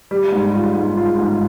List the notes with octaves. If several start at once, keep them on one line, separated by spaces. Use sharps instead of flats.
G3
G#2
F4
G#2
F4
G#2